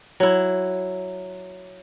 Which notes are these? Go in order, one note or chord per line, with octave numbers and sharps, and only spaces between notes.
F#3 E4